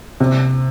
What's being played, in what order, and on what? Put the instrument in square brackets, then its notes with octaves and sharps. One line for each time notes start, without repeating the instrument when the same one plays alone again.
[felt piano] C3